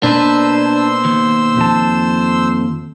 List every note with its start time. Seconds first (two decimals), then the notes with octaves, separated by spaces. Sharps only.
0.03 B2 A#3 D4 B4 C5 E6
1.05 D#2
1.58 F2 A5